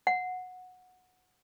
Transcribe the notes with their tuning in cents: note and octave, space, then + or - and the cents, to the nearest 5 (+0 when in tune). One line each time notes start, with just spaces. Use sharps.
F#5 -15